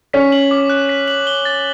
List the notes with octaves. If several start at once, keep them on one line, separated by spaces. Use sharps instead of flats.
C#4 B6
F#7
D6
F#6
B6
F#7
G7
A6